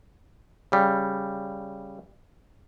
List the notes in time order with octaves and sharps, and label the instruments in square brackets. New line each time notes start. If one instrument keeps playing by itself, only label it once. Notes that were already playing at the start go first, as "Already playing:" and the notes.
[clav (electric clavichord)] C#3 G3